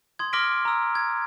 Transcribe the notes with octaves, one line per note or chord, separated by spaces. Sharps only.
C6 D#6 G#6
C6 D6 F6 A#6 B6 D7
A#5 E6
G#6